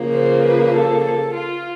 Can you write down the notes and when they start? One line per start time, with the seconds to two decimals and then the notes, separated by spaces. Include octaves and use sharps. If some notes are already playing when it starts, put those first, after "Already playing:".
Already playing: C#3 F3 A#3
0.13 C5
0.43 B4
0.74 A4
1.04 A4
1.34 F4